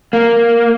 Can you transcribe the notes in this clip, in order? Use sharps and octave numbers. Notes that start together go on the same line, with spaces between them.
A#3